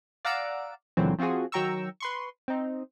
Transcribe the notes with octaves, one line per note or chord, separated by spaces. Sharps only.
D5 F5 F#5 A#5 E6 D7
C#2 A#2 D3 E3 F#3 C4
F3 C4 F4 F#4 G#4
D#3 F#3 G5 A#5 C#6 E6
B4 C6 C#6
C4 D#4